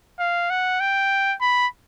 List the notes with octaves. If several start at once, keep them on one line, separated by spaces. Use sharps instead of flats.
F5
F#5
G5
B5